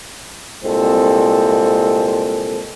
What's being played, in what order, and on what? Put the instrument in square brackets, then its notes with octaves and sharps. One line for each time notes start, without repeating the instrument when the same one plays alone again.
[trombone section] C2 A#2 G#3 C4 A4